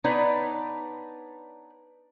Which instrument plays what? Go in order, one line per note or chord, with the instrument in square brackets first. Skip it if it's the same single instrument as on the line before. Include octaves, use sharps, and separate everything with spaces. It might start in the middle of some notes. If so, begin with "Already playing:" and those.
[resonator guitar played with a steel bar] B3 D4 D#4 B4 C#5 D5